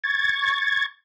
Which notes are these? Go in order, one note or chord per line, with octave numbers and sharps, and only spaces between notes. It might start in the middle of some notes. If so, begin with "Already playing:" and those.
C#6 G#6 A6